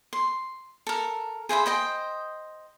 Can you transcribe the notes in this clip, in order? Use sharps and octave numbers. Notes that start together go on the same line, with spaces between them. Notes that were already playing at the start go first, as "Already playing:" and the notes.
C6
A4 A#4
G#4 C5 E5 B5
C5 D#5 G5